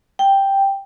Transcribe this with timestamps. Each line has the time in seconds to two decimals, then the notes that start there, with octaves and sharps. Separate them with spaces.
0.19 G5